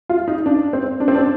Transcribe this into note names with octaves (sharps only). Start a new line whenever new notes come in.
F4
D#4
D4
C4
D4
C4
D4